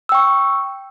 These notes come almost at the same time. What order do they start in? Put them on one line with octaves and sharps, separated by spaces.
E6 G5 C#6